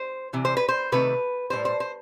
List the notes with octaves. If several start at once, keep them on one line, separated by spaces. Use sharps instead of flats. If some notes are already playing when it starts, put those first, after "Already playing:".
Already playing: C5
C3 E3
C5
B4
C5
C3 D#3 A3 B4
A2 E3 G3 C5
C5
C5